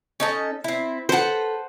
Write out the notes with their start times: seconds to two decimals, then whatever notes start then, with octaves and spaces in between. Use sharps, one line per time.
0.20 C#4 D#4 A4
0.64 C4 E4
1.09 A4 B4 C5 F#5